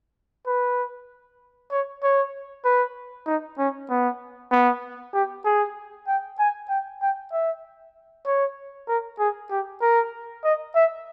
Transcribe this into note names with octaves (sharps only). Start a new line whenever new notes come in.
B4
C#5
C#5
B4
D#4
C#4
B3
B3
G4
G#4
G5
G#5
G5
G5
E5
C#5
A#4
G#4
G4
A#4
D#5
E5